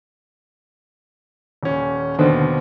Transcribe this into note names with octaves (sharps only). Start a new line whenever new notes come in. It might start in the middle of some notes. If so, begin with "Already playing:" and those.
D#1 C#4
D#2 B2 D3 D#3 C5